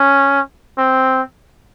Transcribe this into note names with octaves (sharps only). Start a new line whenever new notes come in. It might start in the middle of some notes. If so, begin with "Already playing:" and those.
Already playing: C#4
C4